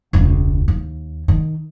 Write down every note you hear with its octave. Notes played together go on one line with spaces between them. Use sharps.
E1 C#2
D#2
D#3